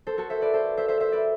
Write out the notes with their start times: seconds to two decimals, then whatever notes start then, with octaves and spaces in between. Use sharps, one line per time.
0.07 A4 C5
0.18 F#4 A4
0.30 C5 E5
0.41 B4 D5
0.54 A4 C5
0.77 C5 E5
0.88 C5 E5
1.00 C5 E5
1.12 B4 D5